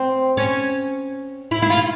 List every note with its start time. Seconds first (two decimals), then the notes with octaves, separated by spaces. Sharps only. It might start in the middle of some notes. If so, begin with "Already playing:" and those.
Already playing: C4
0.37 C#4
1.51 E4
1.62 E4
1.70 F4